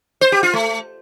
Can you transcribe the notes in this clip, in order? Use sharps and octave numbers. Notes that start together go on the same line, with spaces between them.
C5
G4
F4
A3